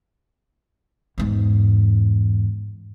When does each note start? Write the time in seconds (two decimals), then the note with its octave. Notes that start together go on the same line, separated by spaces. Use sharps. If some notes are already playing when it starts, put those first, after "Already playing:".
1.18 E2 G#2